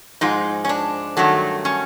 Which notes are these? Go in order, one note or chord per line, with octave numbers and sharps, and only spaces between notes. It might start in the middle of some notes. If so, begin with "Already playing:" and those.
G#2 F3 G#3 D#4
C#4
D4
G2 D#3 F#3 A3
C#4